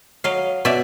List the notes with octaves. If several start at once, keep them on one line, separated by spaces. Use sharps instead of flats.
F#3 D#5 F5
B2 D5 E5